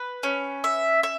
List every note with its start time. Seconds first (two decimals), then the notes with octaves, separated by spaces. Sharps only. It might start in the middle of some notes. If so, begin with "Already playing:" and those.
Already playing: B4
0.23 C#4
0.64 E5
1.03 E5